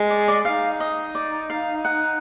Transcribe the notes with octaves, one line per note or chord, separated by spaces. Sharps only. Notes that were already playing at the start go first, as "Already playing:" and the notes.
Already playing: G#3
D5
D5
D#4 F5
D#5
D5
F5
F#5